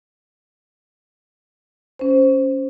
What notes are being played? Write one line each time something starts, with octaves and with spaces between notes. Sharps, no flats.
C#4 C5